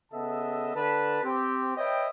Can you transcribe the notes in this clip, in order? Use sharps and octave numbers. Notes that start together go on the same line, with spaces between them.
C#3 B3 A4 D#5 E5 A5
D3 B4 A5
C4 G4
B4 C#5 D#5 E5 G5